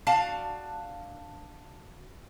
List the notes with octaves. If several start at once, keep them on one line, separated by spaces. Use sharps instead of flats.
D4 F#4 F5 A5